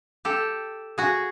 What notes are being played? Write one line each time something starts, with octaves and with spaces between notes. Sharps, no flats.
G4 A4
F#4 G#4